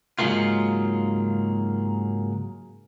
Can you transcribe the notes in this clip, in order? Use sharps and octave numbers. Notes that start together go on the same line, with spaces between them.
G#2 C#3 F#3 G#3 A#3 F4